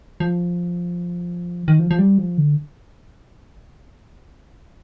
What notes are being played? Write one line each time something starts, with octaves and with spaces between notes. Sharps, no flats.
F3
D#3
F3
F3
G3
F3
D3